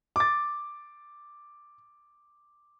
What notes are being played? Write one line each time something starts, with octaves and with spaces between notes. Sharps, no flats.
D6 A6